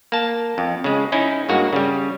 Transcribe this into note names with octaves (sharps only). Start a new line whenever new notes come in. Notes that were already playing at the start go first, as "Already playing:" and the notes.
A#3 A5
F2
C#3 G#3
C#4 D#4 E4
G2 G#3 A#3 F#4
C#3 G3